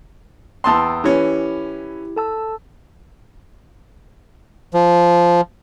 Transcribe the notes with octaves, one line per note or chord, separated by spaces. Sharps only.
E2 G5 A5 C6 D#6 E6
E3 C#4 E4 G4
A4 A5 E6
F3